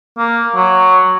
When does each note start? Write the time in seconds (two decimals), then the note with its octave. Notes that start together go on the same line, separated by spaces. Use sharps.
0.18 A#3
0.55 F#3